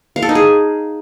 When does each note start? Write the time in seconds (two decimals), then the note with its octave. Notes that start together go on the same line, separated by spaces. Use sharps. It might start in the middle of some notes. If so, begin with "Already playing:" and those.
0.16 F5
0.22 A4
0.29 D#4
0.35 G#4